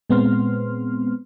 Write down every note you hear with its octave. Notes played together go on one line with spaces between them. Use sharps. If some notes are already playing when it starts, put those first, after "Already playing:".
A#2 G#3 B3 C4 C6 F6